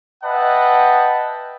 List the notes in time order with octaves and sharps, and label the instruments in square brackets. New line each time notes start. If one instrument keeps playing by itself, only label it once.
[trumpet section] B4 D#5 E5 F#5 G5 A5